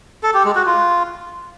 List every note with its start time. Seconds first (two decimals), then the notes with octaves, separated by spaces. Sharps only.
0.23 A4
0.34 G4
0.45 G#3
0.56 F#4
0.66 F4